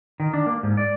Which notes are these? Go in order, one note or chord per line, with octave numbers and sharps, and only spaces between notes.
D#3
D4
A#3
G#2
D5